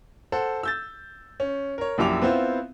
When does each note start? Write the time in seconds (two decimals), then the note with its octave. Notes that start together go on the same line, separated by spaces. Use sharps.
0.32 A4 C5 F#5
0.63 E6 G6 A6
1.40 C#4
1.78 A#4 C#5
1.98 A#1 F#2 E4 G4 D6 F7
2.22 B3 C4 E4 F4 C5